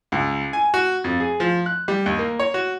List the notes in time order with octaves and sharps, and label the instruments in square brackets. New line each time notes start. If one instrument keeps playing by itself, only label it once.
[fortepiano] C#2
G#5
F#4
F2
G#4
F3
F#6
G3
D#2
A#3
C#5
F#4